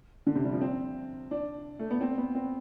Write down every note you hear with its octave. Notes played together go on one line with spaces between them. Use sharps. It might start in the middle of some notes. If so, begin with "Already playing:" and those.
D3
C3
G3
F3
C4
D4
A3
B3
C4
B3
C4